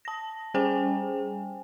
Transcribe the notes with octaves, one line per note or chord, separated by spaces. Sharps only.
A5 A#6
G3 C#4 G#4 C5 G5 G#5